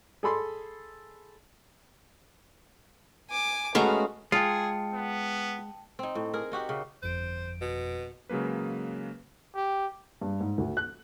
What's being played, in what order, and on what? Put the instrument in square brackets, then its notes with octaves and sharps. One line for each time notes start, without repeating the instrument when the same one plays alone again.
[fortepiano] G#4 A4 B5 C6
[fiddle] G#5 D6
[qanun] G#3 F5 A#5 [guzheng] A3 B3 C#4 [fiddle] F#4
[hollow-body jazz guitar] G#3 [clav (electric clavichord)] F4 [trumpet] G#4 [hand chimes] G5 A5 C#7
[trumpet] B3
[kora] C4 D#4
A2
G#4 A#4
D#4 F#4 G4 F#5
C#3
[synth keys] G1 F2 D7 [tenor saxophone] C5
[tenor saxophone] B2
[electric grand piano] C#3 F#3 G#3 A#3 B4
[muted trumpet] G4
[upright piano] G2
G#2
D2
F#6